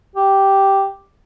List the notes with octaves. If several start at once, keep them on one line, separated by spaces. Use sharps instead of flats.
G4